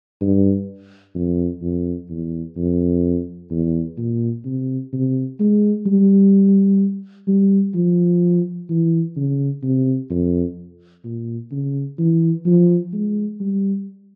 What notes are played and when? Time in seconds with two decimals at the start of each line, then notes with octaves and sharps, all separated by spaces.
0.21 G2
1.15 F2
1.62 F2
2.10 E2
2.56 F2
3.51 E2
3.98 A#2
4.45 C3
4.93 C3
5.40 G#3
5.86 G3
7.28 G3
7.75 F3
8.70 E3
9.17 C#3
9.63 C3
10.10 F2
11.04 A#2
11.52 C#3
11.99 E3
12.46 F3
12.93 G#3
13.40 G3